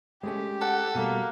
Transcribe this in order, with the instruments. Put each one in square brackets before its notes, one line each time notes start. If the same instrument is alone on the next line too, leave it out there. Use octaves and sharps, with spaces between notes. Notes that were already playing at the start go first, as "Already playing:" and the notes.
[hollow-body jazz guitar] G#3 A3 C#4 [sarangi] G4
[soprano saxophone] A4 [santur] F#5
[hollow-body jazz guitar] B2 G3 A3 [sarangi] A#3